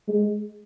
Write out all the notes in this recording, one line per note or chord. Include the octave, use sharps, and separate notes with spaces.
G#3